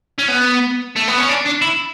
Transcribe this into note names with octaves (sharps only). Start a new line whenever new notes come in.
C#4
B3
A3
B3
C#4
D4
D4
E4